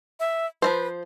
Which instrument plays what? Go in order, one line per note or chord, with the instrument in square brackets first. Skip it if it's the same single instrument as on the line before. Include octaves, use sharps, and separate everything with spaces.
[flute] E5
[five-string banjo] F3 A#3 C5 [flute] B4